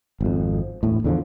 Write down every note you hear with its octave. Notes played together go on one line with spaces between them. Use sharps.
G#1 F2
E1 A2
E2 D3 E3 F3